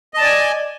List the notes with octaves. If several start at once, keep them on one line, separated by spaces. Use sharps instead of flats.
D5 D#5 G#5 A5